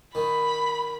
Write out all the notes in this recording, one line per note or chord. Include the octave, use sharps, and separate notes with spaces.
D#3 B5